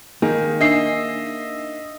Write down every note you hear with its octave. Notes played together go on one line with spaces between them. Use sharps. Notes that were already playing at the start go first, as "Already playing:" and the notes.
D#3 A#3 D#4 G#4
D4 D#5 E5 C7